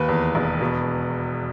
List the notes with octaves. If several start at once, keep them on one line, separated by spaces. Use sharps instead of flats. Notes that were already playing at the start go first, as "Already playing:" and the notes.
Already playing: D#2 B4
E2
E1
B2